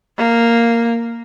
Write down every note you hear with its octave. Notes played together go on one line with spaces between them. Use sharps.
A#3